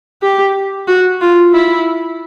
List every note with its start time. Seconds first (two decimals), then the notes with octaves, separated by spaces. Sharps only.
0.22 G4
0.88 F#4
1.21 F4
1.53 E4